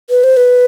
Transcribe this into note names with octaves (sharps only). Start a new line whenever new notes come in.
B4
C5
B4